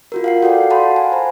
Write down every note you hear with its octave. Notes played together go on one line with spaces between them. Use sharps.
F4 F#4 A#4
F5 F#5 C7
F#4 A4 D5 G5
F5 F#5 A5 B5 C6
G#5
C5 A#5